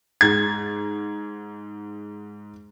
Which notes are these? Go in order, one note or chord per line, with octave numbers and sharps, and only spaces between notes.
G#2 G#6